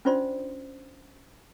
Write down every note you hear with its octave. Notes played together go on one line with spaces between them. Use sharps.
C#4 D4 F4 C5 D5 C6